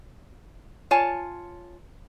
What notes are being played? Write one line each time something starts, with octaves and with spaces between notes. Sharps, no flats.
F4 C#5 G#5 A5